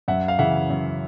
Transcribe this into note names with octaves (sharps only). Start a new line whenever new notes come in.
F#2 E5 F#5
F5
C#3 E3 E5 F#5
F#2